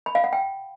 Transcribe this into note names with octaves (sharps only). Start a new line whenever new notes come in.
B5
F5
F#5
G5